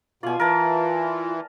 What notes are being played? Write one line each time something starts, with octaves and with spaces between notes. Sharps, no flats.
B2 F4 D5 G#5
E3 A#4 A5